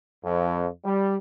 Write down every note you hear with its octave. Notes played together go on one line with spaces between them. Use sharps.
F2
G3